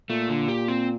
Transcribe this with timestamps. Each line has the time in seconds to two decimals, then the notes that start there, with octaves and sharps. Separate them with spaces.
0.10 A#2 A3
0.29 D3
0.48 G4
0.68 C4